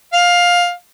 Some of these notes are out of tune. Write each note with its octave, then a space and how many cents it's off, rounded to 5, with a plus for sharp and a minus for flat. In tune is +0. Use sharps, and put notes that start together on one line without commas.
F5 +15